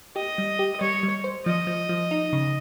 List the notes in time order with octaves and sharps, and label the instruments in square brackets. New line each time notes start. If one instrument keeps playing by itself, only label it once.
[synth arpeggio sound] G4 [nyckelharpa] D#5
[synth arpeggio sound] G3
G4
[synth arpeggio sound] G3 [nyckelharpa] C#5
[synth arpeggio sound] G3
C5
[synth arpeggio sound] F3 [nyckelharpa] D#5
[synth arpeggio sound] F3
F3
D#4
C#3